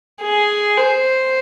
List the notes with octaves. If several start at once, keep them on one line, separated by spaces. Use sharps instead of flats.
G#4
C5